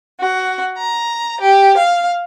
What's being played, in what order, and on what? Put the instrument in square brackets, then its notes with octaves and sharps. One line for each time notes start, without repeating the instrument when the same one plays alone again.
[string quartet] F#4
A#5
G4
F5